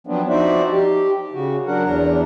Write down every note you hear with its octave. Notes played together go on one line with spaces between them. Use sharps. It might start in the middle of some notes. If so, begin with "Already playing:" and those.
F3 F#3 B3 C4 D4
F3 D#4 F#4 C5 D5 E5
G4
C#3 F#4
F#3 D4 A#4 F#5
E2 D4 A#5